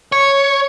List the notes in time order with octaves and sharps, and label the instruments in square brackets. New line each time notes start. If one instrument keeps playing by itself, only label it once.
[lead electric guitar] C#5